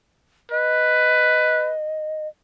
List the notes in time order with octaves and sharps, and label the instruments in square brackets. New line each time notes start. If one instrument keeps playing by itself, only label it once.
[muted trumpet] B4 [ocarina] D#5